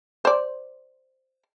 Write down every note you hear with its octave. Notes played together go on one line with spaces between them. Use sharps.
C5 D5